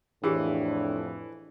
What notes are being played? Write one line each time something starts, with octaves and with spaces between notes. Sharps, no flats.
F2 A2 E3 D4 G4 G#4